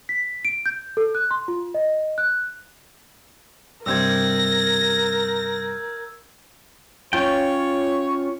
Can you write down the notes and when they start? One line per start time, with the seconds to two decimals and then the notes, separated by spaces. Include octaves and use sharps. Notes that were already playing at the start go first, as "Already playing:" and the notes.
0.09 B6
0.45 D7
0.66 G6
0.97 A4
1.15 F#6
1.31 C6
1.48 F4
1.74 D#5
2.18 F#6
3.86 G2 C3 G3 A#4 E6 G6 G#6 A#6
7.13 C#4 F4 C#5 G5 C#6